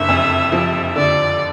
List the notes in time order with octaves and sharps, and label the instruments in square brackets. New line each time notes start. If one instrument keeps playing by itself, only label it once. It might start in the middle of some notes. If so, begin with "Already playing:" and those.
Already playing: [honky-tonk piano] F#1 D3 [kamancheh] E5
[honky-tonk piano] F2
F3
[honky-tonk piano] D3 [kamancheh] D5